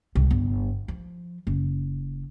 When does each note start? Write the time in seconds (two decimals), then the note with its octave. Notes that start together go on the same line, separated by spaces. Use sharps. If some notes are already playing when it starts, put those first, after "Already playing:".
0.15 C2
0.31 G1
0.88 F3
1.47 F#1